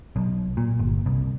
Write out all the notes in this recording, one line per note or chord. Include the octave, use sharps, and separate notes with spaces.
B1
A#2
G1
C2